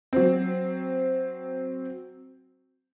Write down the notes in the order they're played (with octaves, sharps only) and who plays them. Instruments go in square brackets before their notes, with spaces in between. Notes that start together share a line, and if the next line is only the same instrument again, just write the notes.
[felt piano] F#3 C4